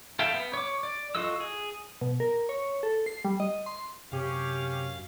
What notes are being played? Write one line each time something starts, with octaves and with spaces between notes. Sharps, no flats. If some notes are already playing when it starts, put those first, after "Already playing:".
A4 E5 F5 G5 A5
B3
C#5 D6
D5
F4 F#4 A4 D#5 E6
G#4
B2
A#4
C#5
A4
C7
G3
D#5
C6
F#2 C3 C#4 G4 F5